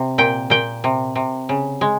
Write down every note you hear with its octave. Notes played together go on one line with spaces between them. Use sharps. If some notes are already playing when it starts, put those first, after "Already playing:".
Already playing: C3
A#2 G5
A#2 G5
C3
C3
C#3
G#3